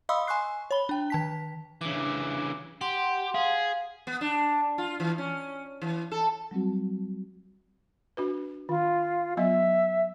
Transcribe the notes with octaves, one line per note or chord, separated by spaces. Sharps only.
D#5 F5 B5 C6 D#6 E6
G#5 C6 C#6 F#6 C7
C#5 B5 G7
D4 G5
D#3 A5 B6
C#3 E3 D4 D6
G4 F#5 C6
G#4 F5
B3
D4
F4
E3
C#4
E3
A4
F#3 G3 C4 F#4
D4 F#4 B4
D#3 F4
F#3 B3 D#5 E5